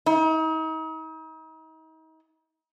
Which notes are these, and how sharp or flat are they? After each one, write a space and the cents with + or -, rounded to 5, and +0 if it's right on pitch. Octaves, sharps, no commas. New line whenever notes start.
D#4 +40